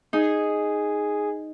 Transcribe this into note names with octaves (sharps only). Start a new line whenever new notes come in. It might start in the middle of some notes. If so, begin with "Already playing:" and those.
D#4 G#4